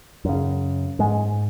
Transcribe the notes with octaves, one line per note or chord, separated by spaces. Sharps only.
F#2 C#3
G#2 G#3